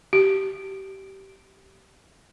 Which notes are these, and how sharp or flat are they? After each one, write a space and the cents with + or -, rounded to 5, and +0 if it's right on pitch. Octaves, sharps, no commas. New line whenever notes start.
G4 -20